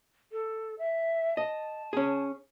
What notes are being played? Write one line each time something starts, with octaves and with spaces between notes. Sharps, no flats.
A4
E5
D#5 A5
C#4 G#4